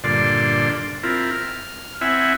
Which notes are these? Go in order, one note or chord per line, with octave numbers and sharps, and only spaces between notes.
G2 A#2 D3 D5 C6
C4 E4 F4 A#4
F6
C4 E4 E5 F#5 G#5